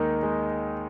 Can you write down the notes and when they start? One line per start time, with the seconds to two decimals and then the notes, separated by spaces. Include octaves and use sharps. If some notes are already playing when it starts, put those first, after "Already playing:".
Already playing: D#2 D#3 G#3 D#4
0.23 G#3